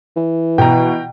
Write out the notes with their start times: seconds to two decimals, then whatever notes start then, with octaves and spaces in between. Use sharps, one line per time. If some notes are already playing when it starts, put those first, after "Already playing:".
0.16 E3
0.58 B2 G5 A#5